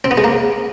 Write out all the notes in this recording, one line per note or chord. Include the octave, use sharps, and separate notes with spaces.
C4
B3
G#3
A#3